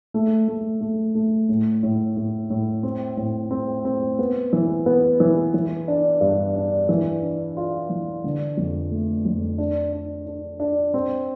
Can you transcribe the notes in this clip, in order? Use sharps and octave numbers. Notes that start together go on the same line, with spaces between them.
A3
A3
A3
A3
A2
A2
A2
A2
C4
A2
C4
C4
B3
E3
B3
E3
E3
D4
G2
D4
E3
D4
F4
E3
D3
F2
A3
F2
D4
D4
D4
D4
C4